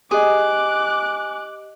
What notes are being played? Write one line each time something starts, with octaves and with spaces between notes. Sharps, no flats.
G4 G#4 D#5 D6 F#6